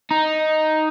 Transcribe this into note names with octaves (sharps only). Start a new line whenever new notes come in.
D#4